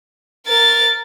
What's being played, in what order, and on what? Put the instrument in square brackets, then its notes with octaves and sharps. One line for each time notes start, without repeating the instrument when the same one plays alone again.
[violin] A#4 A6